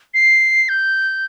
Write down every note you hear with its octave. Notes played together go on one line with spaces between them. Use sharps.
C7
G6